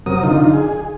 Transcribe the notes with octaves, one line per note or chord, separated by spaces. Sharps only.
F#2 C3 F#3 A#4 D#6
D3 D#4 F4
G#4